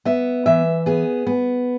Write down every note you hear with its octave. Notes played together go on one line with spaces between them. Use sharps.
B3 E5
E3 E5
B3 G#4
B3